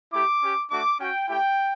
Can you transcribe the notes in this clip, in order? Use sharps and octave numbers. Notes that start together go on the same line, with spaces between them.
A3 E4 G4 D6
C#4 G4
A3 D4 F#4 D6
C#4 F#4 G5
A3 E4 G4 G5